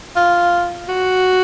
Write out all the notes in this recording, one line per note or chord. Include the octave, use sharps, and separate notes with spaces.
F4
F#4